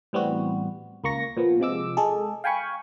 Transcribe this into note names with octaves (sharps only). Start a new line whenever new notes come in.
A2 E3 G3 B3 C4 F#4
C#2 A#3 C#6 A#6
A#2 F3 B3
C3 F3 G#3 D6 E6
G#3 G#4 A4
F5 G5 G#5 B5 C#6